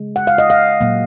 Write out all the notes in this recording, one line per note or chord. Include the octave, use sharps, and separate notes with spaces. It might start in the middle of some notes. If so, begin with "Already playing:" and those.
Already playing: C#3 G#3
F#5
F5
D#5
F5
A#2 F#3 A#3